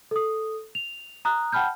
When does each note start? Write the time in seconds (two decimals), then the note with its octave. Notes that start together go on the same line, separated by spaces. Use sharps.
0.11 A4 D#6
0.75 F7
1.25 A#5 D#6 F#6
1.52 F#5 G5 A5 B5 F6 G6